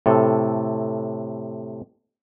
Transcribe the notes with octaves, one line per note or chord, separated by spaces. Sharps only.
A2 C3 A4